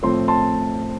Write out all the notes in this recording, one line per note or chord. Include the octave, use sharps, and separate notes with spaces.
A2 F3 A3 C4 C6
A5 C6